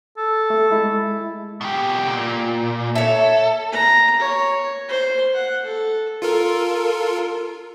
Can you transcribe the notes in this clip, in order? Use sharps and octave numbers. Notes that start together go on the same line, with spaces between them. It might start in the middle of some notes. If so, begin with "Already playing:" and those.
A4
A3
G#3 E4
B2 G4
A#2
A4 C#5 E5
A#5
C#5
C5
F#5
A4
F4 A4 A#4